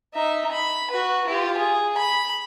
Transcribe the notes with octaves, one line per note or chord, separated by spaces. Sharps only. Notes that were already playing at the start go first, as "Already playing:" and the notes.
D#4 E5
B5
F#4 B4
F4 G4
G#4
B5